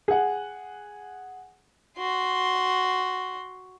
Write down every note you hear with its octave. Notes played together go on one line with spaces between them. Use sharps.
G#4 F#5
F#4 C6